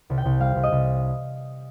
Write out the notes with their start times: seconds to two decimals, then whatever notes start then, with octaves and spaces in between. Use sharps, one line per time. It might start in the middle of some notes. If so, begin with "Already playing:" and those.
0.10 C2
0.18 G5
0.25 C2
0.40 G3 F5
0.56 C2
0.63 D#5
0.72 C2